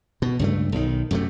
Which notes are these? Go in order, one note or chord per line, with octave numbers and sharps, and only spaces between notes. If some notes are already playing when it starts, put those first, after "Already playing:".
B2
C#2 G2 A3
B1 D#3
F#2 C3 A3